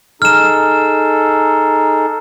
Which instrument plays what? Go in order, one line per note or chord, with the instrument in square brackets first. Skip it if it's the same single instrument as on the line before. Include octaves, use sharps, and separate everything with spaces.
[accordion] D#4 G#4 A4 [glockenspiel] F6 E7